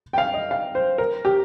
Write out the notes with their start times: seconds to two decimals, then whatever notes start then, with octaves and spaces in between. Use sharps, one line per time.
0.13 G5
0.18 F5
0.34 D#5
0.51 F5
0.75 C5
0.98 A#4
1.25 G4